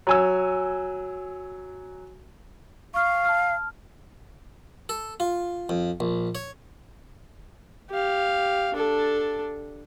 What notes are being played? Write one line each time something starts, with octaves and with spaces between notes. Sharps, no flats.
F#3 G#5 E6
F5 C#6 F6
A5 F6
A4
F4
F2
A#1
C#5
G4 F5
D4 A4